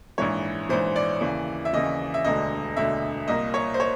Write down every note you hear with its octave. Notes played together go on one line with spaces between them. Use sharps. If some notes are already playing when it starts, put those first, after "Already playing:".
A#1 G#2 E3 C#5
A#1 G#2 E3 C5
D5
D#2 C#3 E3
E5
D#2 C#3 E3 D#5
E5
E1 D2 D3 D#5
E1 D2 D3 E5
C2 A#2 D#5
C#5
C5
C#5